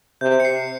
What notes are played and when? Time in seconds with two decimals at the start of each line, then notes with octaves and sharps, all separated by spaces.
0.21 C3 G6
0.40 C#7
0.45 C7